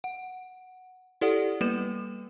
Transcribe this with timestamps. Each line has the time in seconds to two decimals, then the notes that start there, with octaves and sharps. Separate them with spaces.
0.04 F#5
1.21 E4 G4 A4 D5 F#5 D#6
1.61 G3 A#3 B3 B4 E7